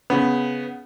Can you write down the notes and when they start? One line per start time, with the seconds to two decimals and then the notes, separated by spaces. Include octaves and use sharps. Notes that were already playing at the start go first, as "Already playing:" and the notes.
0.10 C#3 B3